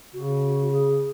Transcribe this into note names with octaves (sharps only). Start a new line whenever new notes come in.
C#3 F#4
G#4